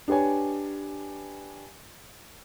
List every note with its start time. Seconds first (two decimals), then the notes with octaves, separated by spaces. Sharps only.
0.08 D4 G4 B4 C#5 G#5